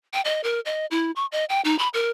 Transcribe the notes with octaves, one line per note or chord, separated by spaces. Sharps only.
G5
D#5
A#4
D#5
E4
C#6
D#5
G5
D#4
B5
A#4